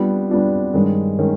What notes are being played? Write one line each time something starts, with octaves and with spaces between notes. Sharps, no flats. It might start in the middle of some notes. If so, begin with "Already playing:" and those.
Already playing: G3 B3 D4 F4
G3 B3 D4 F4
G2 D#3 G#3 C#4
D#3 G#3 C#4